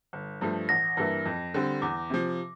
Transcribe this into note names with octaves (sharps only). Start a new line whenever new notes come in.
G1
G2 F3 A3
A1 A#6
G2 E3 A#3 E4
F2
D3 G3 C4
E2 D6
C3 F3